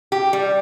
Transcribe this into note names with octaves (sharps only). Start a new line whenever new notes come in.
G4
G3